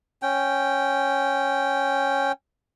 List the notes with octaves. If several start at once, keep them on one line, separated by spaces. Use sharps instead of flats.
C#4 G5